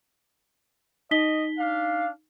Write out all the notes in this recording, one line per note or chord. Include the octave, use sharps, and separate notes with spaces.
D#4 D#5 B6 G7
D4 F5